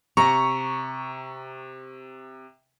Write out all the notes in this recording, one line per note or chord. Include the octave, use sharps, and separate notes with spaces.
C3 A#5 C#6